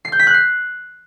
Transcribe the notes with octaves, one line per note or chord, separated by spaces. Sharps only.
C7
G6
B6
F#6
C7